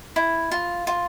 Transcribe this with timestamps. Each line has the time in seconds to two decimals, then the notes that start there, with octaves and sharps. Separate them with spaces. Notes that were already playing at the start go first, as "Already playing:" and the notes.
0.16 E4
0.51 F4
0.87 F4